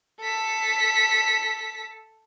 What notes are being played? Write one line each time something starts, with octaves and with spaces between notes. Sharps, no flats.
A4 B6